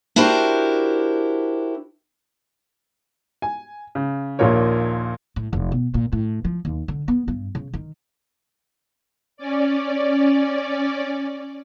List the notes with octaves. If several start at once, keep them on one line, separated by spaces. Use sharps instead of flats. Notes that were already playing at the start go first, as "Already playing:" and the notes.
D4 E4 F#4 G4 A#4 C5
G#5
C#3
A#1 D#2 A#2 A#3 A#4 C#5
A2
F1
B2
A#2
A2
F3
D#2
D3
B3
G2
C#3
D#3
C#4 D5